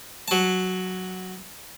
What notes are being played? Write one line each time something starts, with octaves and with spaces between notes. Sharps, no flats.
F#3 A5